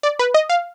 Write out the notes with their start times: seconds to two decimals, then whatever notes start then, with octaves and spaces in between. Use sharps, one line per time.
0.03 D5
0.19 B4
0.34 D#5
0.50 F5